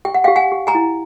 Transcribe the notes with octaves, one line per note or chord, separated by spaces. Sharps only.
G4 G5
F#5
G4 F5 G5
F#5 G#5
G4
G#5 A#5
E4